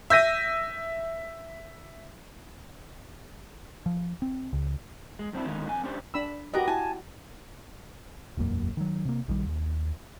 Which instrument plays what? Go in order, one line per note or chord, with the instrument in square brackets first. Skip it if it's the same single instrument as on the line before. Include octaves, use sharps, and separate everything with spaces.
[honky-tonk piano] E5 G6 A#6 D#7
[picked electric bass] F3
C4
C#2
[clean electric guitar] G#3
F#2 C4 D4 E4
E2 D3 D#3 G#3 D#5 F5
F2 G#5
C#4 D4 G4 C5
[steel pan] D4 B5 E6
[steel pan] F#4 G4 D#5 [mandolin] A#4 B4 A#5
[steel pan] E4 [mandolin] G#5 A5
[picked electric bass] E1 B1 F#2 A#3
D#3 F#3
C3 A#3
A#1 D#3 E3 G3
D#2